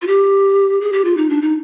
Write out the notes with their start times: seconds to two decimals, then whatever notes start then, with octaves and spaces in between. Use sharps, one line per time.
0.02 F4
0.07 G4
0.81 G#4
0.93 G4
1.05 F4
1.17 D#4
1.30 D4
1.42 D#4